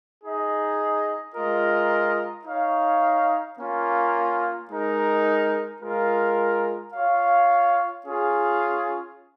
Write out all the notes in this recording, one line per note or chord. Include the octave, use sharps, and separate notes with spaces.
D#4 G#4 D#5
G#3 F4 A#4 D#5
D#4 C#5 F5
A#3 C#4 F4
G#3 D#4 A#4
G#3 F4 A#4
F4 C#5 F5
C#4 F4 G#4